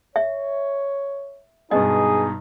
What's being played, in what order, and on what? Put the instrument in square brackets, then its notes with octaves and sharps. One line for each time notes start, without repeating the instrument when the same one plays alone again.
[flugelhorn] C#5 [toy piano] E5
[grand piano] G2 B2 G#3 [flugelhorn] D#4 [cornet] G#4 [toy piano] D#5